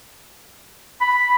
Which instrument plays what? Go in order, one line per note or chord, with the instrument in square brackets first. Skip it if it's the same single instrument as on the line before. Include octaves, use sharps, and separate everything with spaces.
[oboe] B5